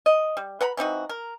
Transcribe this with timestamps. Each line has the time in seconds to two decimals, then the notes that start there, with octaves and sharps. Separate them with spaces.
0.06 D#5
0.37 G3
0.61 B4 F#5 A#5 B5
0.77 E3 C4 D#4 F#4
1.09 A#4